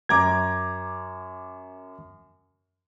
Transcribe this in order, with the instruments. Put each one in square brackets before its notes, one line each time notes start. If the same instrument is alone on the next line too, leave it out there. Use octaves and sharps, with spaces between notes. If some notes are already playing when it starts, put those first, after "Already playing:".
[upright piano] F#2 A#5 D6 [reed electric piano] G#6